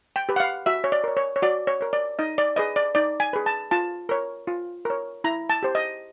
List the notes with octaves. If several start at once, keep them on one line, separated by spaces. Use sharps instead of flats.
G5
G4 B4
F#5
F5
F#4 E5
C#5
D5
A#4 C#5
C#5
C#5
F#4 D5
C#5
A#4 C#5
D5
D#4 D#5
D5
G#4 B4 D#5
D5
D#4 D5
G#5
G#4 B4
A5
F4 A5
A#4 C#5
F4
A#4 C#5
E4 A#5
A5
G4 C5
D#5